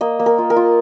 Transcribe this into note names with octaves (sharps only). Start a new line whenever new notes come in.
A#3 D#5
A#3
A#4
F4
A#4
F4